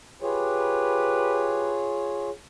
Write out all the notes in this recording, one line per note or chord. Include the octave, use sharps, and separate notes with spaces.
F4 G4 G#4 B4 C#5